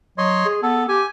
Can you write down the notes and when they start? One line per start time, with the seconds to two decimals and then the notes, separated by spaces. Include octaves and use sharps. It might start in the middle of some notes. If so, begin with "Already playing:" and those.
0.18 F#3 C#5 D#5 C6
0.45 G#4
0.63 B3 A4
0.89 G4 G#5